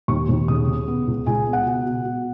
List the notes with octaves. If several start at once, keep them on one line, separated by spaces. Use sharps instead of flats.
D#2 C#6
D#2
C#3 D#6
C#3
B3
C#2
C#2 G#5
B3
F#5
B2
B2
B2